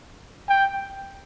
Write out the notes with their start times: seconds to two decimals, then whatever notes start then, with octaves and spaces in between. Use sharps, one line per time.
0.48 G5